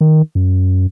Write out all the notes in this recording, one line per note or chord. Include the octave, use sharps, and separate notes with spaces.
D#3
F#2